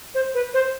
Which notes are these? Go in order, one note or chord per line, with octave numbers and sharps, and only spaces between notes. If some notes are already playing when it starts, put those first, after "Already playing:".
C5
B4
C5